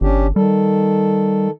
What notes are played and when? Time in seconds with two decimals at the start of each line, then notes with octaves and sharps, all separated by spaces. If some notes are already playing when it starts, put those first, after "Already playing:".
0.01 G1 C#4 D4 G4
0.36 D#3 G3 A4